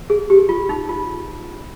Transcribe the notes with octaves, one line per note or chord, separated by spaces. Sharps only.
G#4
G4
F4
D#4
F4